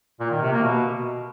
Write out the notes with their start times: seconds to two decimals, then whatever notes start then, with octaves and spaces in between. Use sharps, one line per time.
0.20 A#2
0.31 D#3
0.41 C3
0.52 A#3
0.63 B2